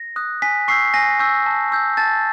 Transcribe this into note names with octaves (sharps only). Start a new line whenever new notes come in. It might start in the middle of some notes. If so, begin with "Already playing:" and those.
Already playing: A#6
D#6 F#6
G#5 B6
C#6 E6 G6 C7
G#5 A#6
C#6 E6 G6
A5
C#6 E6 G6
A5 A6